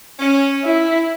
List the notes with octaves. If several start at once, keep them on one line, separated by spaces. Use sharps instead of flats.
C#4
E4